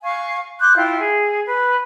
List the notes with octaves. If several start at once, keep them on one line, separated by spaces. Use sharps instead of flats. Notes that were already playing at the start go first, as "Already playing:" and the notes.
F5 G#5 C#6
C6 D6 F#6 G6
E4 F4 G5 C6
G#4
B4